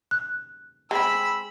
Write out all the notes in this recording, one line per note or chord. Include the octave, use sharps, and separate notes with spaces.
F#6
G#3 C4 B5 E6